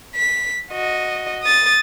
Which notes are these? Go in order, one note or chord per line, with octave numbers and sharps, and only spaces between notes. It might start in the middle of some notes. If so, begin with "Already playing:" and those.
B6
F#4 D#5
D#6 A6